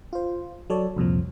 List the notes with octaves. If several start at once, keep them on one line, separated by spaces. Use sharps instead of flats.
F4 C5
F#3 A4 C#5 D5
C2 F2 A#2 F3